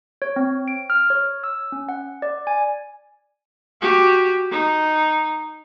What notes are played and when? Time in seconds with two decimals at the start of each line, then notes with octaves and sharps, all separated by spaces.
0.22 C#5
0.36 C4
0.68 D7
0.90 F6
1.10 C#5
1.44 E6
1.72 C#4
1.89 F#5
2.22 D5
2.47 G#5
3.81 F#4 G4
4.51 D#4